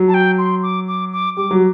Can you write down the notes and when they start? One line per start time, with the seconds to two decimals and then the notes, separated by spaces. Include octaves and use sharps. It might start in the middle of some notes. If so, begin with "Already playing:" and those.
Already playing: F#3
0.08 A5
0.14 G5
0.38 C6
0.63 D6
0.88 D6
1.13 D6
1.37 G3 D6
1.51 F#3